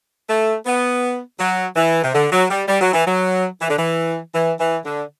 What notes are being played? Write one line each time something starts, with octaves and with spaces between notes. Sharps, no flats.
A3
B3
F#3
E3
C3
D3
F#3
G3
G3
F#3
E3
F#3
E3
D3
E3
E3
E3
D3